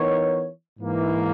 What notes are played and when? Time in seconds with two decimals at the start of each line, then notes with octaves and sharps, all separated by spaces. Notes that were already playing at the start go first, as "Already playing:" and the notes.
Already playing: E3 B3 D#4 A#4 C#5
0.78 G#2 E3 A#3